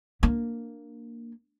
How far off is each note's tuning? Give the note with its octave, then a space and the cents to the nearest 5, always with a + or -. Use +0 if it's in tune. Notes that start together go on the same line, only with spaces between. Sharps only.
A#3 +0 D4 +0